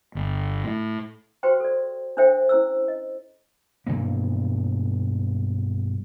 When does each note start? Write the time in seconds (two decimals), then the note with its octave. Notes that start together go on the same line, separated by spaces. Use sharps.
0.15 G1
0.64 A2
1.43 F#4 G4 B4 C5 G5 C6
1.60 A4 D5
2.17 D4 A4 C5 E5 G5
2.49 C#4 E4 C5 E6
2.88 D#5
3.87 B1 E2 G2 A#3